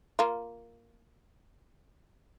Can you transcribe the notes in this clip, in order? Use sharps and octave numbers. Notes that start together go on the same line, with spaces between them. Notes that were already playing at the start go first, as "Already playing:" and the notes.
A#3 F4